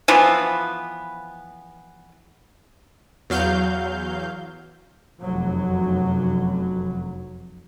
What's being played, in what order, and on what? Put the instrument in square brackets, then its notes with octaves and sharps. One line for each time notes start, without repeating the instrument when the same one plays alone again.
[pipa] E3 F3 B3
[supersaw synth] E2 F#3 F5 G6
[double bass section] F1 F#2 F#3